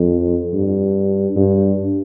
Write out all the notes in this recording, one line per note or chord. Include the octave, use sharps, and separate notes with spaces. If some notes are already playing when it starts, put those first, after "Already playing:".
Already playing: F2
G2
G2